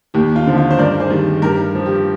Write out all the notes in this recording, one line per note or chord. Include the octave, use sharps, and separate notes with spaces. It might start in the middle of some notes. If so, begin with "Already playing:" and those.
D#2 G4
F4
D3 F3
F4
C5
G2 A#4 D5
G#4 C5
D#3 G3
G2 G4 A#4
F3
G4